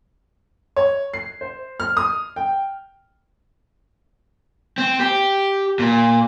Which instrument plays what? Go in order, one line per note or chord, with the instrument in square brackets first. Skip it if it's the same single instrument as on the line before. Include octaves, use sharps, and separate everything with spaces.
[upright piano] C#5
C7
C5
F6
D#6
G5
[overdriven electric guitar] C4
G4
A#2